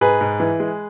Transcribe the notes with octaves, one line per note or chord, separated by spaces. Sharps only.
G#2 G#4 B4
G#2
E3
G#3